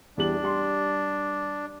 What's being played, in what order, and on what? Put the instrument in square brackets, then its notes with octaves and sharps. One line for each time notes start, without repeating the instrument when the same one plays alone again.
[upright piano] E2 G3 F#7 [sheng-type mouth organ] D4
[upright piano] G3 C6